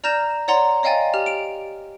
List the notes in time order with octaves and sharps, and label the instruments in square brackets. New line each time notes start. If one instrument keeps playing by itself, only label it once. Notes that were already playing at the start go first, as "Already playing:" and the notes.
[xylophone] D5 A#5 F6 G6 A#6 E7
C#5 D5 F#5 A#5 C6
C#5 D#5 F5 G5 G#5 A6
G4 F6 F7
D7 F7